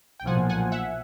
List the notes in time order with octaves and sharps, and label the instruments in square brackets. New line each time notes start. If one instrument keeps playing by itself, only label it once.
[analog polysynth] G5
[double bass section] B1 A#2 F3 [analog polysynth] F#5 G#5
[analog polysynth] F#5 G#5
E5 F#5